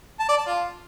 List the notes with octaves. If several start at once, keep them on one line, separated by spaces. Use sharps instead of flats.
A5
D5
A5
F4